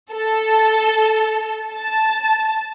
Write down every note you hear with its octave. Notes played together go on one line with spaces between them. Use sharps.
A4
A5